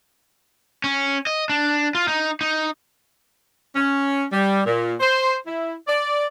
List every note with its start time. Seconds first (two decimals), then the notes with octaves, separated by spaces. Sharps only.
0.84 C#4
1.27 D#5
1.50 D4
1.95 F4
2.08 D#4
2.41 D#4
3.76 C#4
4.32 G3
4.66 A#2
5.00 C5
5.47 E4
5.87 D5